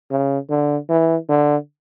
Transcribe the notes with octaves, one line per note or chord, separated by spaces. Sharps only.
C#3
D3
E3
D3